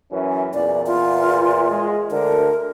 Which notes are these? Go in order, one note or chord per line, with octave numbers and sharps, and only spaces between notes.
F#2 E3 C#4
E2 A#2 D5
F4
G#3
D2 D3 A#4